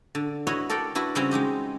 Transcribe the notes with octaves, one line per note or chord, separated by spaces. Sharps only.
D3
E4 F#4 B4 C#5 D#5
A4 A#4 D5 F#5 G5
D4 E4 F#4 B4
C#3 G3 C4 C#4 E4 F#4
G#3 D#4 G4 D#5